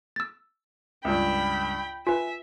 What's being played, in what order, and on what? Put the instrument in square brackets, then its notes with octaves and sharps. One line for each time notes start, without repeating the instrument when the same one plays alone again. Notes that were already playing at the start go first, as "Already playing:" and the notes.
[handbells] E6 A6
[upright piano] C#2 G2 [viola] G5 B5
[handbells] F4 B4 [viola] E5 [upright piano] G#5